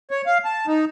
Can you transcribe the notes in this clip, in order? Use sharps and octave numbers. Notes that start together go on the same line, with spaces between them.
C#5
F5
A5
D#4